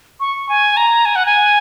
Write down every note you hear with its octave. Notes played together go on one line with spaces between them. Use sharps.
C#6
G#5
A#5
G#5
F#5
G#5